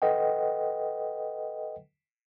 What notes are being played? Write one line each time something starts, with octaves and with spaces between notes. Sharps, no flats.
A4 B4 D#5 F#5 G5